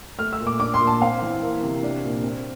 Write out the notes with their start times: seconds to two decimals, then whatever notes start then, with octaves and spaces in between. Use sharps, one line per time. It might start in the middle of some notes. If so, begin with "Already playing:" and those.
0.19 A3 F6
0.33 E6
0.40 A#2
0.47 D6
0.60 D4 D6
0.74 C6
0.81 A#2
0.87 A5
1.02 C4 F5
1.22 E3
1.42 A#3
1.63 C3
1.83 D4
2.03 A#2
2.23 C4